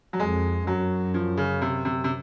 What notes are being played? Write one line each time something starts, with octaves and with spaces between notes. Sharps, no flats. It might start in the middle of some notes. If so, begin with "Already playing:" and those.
F#3
F2 G#3
F#2 F#3
F3
C#3
C3
C3
C3